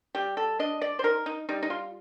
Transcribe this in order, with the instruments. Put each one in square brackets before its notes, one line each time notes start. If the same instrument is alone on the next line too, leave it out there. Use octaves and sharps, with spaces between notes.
[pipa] G3 G4
A4
D4 D#5
D5
C5
D#4 A#4
D#4
G3 D#4
D#4
F4